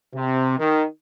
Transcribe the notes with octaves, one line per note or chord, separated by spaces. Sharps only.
C3
D#3